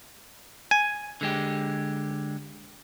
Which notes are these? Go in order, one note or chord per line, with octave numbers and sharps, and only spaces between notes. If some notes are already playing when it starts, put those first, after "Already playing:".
G#5
D3 G#3 G4